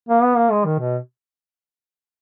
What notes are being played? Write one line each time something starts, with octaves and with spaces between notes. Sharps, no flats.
A#3
B3
A#3
G#3
D#3
B2